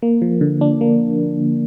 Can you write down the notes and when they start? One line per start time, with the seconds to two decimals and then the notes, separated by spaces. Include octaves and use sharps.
0.03 A#3
0.22 F3
0.41 D3
0.61 D4
0.81 A#3